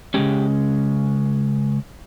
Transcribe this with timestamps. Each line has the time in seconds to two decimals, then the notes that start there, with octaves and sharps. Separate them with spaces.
0.14 C#3 G#3 C#4 G4